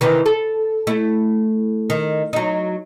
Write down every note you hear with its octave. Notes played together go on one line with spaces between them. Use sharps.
C3 D#3 E3
A4
A3 E4
D#3
F#3 D#4